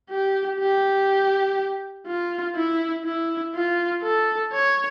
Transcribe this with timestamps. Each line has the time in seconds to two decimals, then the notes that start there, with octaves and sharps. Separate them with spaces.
0.10 G4
0.60 G4
2.07 F4
2.56 E4
3.05 E4
3.55 F4
4.03 A4
4.52 C#5